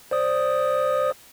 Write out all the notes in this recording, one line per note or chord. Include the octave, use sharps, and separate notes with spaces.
C5 D5 D#6